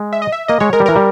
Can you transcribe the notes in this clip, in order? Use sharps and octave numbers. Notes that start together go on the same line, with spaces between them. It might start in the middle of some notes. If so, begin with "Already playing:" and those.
Already playing: G#3
E5
D#5
E5
A#3 D#5
G#3 C#5
G#3 A#4
G3
E3 A#4
G3